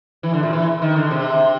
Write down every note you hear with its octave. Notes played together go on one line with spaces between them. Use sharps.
E3
D3
A#2
E3
D#3
D3
C3